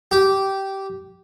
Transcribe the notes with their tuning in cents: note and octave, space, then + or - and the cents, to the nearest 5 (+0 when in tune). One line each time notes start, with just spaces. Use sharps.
G4 -15